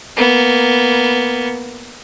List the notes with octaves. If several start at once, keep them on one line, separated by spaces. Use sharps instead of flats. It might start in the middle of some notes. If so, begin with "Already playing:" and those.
A#3 B3